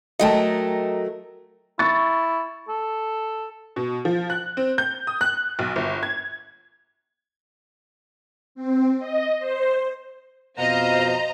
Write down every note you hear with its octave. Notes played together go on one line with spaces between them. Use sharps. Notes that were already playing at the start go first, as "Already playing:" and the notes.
F#3 A3 A#4 D#5 G5 A5
E4 C#6 A6
A4
B2
F3
F#6
C4
G6
D#6
F#6
B1
G1
G#6
C4
D#5
C5
F2 B2 C5 D#5 F5 A#5